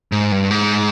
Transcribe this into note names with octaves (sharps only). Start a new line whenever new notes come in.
G#2
G2
G#2